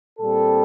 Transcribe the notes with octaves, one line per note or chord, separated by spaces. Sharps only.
A#2 G3 C4 A4